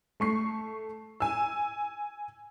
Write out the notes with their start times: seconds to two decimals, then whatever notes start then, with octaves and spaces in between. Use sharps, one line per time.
0.20 A3 C#6 C7
1.20 G#5 E6